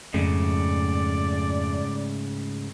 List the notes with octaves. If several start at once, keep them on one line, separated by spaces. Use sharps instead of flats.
F2 G#2 C#3 A3 D5